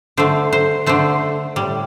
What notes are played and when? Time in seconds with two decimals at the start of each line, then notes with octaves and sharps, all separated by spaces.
0.17 D3 A3 C5
0.53 C5
0.86 D3 A3 C5
1.56 A2 G3